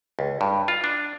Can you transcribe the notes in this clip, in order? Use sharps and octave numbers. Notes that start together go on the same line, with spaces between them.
C#2
G2
F4
D4